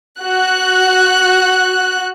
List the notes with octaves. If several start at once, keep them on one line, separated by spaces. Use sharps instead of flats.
F#4 F#6